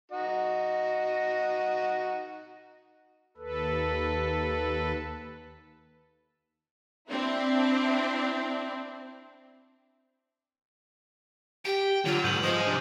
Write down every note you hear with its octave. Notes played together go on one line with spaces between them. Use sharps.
D#4 F#4 D#5
D#2 A4 B4
C4 D4 E4
G4 G5
D3 F#3 F4 F6 F7
B1 G#2 G6 D#7 F#7
F3 G#3 C5 D#6
C3 D4